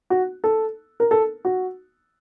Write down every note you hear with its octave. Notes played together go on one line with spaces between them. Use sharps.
F#4
A4
A#4
A4
F#4